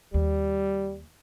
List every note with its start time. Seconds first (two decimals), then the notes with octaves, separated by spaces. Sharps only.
0.14 D#2 G3